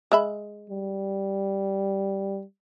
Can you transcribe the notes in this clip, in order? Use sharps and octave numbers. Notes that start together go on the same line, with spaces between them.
G#3 E5 B5
G3